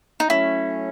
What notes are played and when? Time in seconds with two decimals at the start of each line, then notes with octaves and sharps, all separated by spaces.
0.20 D#4
0.29 F#3 A3 C#4 E4